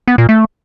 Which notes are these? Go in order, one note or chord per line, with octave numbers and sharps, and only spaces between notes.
B3
A#2
A3